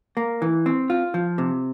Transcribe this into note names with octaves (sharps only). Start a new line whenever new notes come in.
A#3
E3
C4
F4
F3
C3